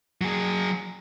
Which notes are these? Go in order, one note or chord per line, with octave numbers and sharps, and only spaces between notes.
F#3 G#4